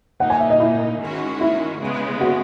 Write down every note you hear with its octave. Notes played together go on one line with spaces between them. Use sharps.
A#2 A#3 D#4 F#5
G#5
E5
D#5
E4
D#3 G#3 C#4 F#4
E4
C#3 G#3 B3
F#4